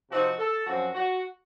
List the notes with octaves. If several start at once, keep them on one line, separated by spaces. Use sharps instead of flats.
C3 F3 C4 D#4 F#4
A4
F#2 F3 C4 F#4
F#4